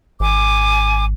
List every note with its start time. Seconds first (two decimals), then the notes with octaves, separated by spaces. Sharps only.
0.20 G#1 G#5 D6